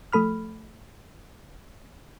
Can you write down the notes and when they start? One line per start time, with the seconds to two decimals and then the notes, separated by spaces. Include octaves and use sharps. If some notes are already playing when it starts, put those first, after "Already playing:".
0.13 F3 A3 A4 B5 F6